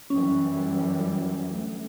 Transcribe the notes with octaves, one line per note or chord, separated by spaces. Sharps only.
F#2 E3 G3 C#4
D2